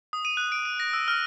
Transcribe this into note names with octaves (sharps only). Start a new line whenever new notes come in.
D#6
D#7
F#6
D7
D#7
A#6
E6
F6